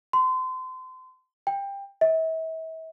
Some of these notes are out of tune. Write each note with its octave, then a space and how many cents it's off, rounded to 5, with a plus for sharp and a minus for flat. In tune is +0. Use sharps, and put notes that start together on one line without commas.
C6 -30
G5 +20
E5 -40